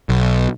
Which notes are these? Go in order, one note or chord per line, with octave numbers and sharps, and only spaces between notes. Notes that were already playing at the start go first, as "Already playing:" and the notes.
B1